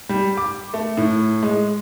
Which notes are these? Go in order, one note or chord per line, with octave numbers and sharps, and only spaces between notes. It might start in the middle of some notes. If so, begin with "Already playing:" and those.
G3
D6
A3
A2
G#3